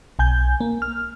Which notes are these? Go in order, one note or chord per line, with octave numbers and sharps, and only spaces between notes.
B1 G#5 G6
A#3
F6